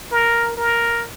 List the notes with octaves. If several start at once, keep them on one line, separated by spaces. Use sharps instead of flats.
A#4
A#4